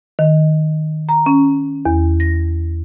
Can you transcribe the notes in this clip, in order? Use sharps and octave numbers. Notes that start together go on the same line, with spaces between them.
D#3
A#5
C#4
E2
A#6